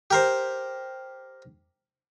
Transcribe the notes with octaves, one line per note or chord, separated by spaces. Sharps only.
G4 A#4 C5